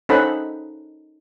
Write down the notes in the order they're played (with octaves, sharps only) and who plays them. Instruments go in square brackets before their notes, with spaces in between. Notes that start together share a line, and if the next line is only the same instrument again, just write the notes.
[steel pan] C#4 D#4 A4 C5 F#5 B5